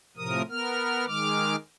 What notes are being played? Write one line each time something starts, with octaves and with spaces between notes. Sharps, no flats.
A2 C3 F3 A#4 D#6
B3 A#4 F6
D#3 G#3 D6 F6